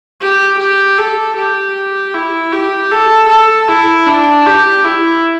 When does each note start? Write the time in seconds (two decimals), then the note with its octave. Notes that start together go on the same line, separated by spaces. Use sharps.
0.21 G4
0.60 G4
0.98 A4
1.37 G4
2.14 E4
2.53 G4
2.92 A4
3.29 A4
3.68 E4
4.06 D4
4.46 G4
4.84 E4